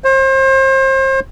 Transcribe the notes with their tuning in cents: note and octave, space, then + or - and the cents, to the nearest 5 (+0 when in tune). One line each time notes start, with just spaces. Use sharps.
C5 +35